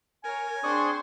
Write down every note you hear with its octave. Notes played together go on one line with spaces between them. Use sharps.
A#4 C#5 G#5
C4 D4 G#4 C5 D5 C6 C#6 D#6